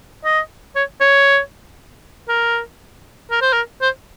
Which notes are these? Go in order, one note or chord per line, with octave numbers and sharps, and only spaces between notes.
D#5
C#5
C#5
A#4
A#4
C5
A#4
C5